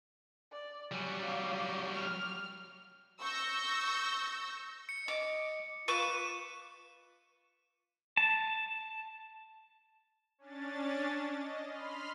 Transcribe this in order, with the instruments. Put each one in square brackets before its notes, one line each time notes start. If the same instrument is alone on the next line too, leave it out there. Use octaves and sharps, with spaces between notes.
[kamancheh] D5
[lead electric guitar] F#3 G3 [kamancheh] G#5
[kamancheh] F5 D6
D6
F6
[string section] C#6 E6 G6 A#6
[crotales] C#7
[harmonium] D#5 [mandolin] D6
[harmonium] F4 [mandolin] B4 C#6 D6 [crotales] C#7 D#7 E7
[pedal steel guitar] A5
[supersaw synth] C#4 D4 A6
D#5
B5 C6 F6